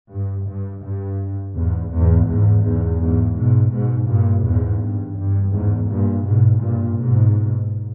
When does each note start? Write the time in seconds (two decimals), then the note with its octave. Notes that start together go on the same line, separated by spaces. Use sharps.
0.11 G2
0.47 G2
0.83 G2
1.56 E2 G#2
1.91 E2 G#2
2.28 E2 G#2
2.63 E2 G#2
2.99 E2 G#2
3.36 G#2 B2
3.71 G#2 B2
4.07 G2 A#2
4.43 E2 G#2
4.81 G2
5.16 G2
5.51 E2 G#2
5.88 G2 A#2
6.24 G#2 B2
6.60 G2 A#2
6.96 G#2 B2